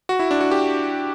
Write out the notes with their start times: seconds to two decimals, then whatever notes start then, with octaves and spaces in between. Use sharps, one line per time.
0.09 F#4
0.19 E4
0.31 D4
0.41 F#4
0.51 G4